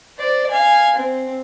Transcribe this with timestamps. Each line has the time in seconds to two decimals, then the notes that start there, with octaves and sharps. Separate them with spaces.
0.18 C5 D5
0.51 F5 G#5
0.95 C4